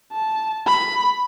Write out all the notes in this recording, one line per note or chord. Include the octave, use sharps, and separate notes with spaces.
A5
B5